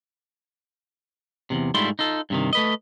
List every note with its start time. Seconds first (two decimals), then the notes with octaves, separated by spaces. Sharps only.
1.50 E2 G#2 C3
1.74 G#2 G3 A3 E4 F4 C6
1.99 D#4 F4 A4
2.30 G2 C3 D#3
2.53 A3 B4 D#5